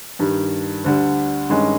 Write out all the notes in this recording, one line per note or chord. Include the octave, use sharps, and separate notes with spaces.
G2 D#3 G3
D2 D3 G3
G2 D#3 G#3 C#4